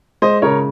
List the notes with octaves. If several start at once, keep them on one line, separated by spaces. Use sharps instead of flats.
G#3 C5 D#5
C#3 A#4 C#5